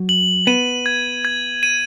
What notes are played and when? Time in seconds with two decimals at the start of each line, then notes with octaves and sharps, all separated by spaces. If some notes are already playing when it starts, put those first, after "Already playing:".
Already playing: F#3
0.09 F#7
0.47 B3 D#7
0.86 G#6
1.25 G#6
1.63 D#7